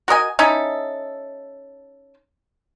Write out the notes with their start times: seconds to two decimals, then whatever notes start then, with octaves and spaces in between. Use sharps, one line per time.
0.08 F#4 A#4 D#5 G#5
0.39 C#4 D#4 E4 A4